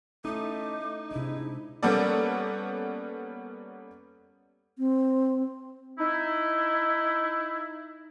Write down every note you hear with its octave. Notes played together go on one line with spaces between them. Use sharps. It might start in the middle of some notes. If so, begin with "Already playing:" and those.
A3 C#4 D#4 E4 D6
G#2 C3 D4 E4
G3 A#3 B3 C#4 A4 D5
C4
D#4 E4